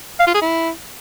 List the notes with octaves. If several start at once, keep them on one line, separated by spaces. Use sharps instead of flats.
F5
F4
G#4
E4